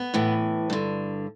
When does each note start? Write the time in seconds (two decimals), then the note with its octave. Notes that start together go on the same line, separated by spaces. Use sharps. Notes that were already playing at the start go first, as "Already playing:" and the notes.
Already playing: B3
0.14 A2 E3
0.70 G2 D3